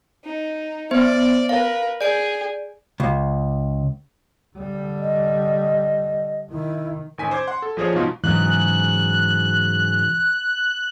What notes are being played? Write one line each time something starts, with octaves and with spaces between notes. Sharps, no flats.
D#4
B3 C5 D5
A#4 B4 F5
G#4 D5 D7
C#2
D3 G3
D#5
D#3 E4
A1 D#3 G#5 B6
C5 D6 G#6
F#5 C6
A4
A#1 F3 G#4 C5 C#5
G#2 B2 F3 D#4 F4
G#2 C#3 E3 F#3 F#6